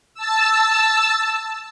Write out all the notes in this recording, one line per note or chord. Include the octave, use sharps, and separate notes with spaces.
A5 E6